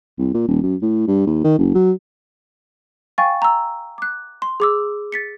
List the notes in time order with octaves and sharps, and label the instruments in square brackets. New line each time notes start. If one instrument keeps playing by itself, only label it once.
[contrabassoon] C2
A#2
D#1
F#2
A2
G2
D#2
D#3
F#1
F#3
[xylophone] F5 G5 G#5 C#6 A6
A#5 E6
D6 F#6
C6
G#4 D6 E6
A6 B6 C#7